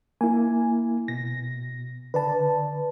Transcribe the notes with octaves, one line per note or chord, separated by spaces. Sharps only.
A#3 E4 G#5
B2 A#6
D3 B4 D5 A5